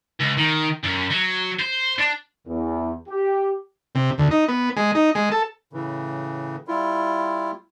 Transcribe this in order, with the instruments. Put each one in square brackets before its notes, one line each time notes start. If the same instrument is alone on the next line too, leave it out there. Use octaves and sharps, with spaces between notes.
[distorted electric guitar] C#2
D#3
F#2
F#3
C5
D4
[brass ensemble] E2
G4
[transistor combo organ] C3
D2
D#4
B3
G#3
D#4
G#3
A4
[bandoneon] A2 C#3 E3
G3 E4 F4